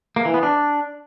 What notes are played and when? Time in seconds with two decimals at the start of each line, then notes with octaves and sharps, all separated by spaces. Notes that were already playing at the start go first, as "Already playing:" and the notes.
0.16 A#3
0.25 E3
0.34 B3
0.43 D4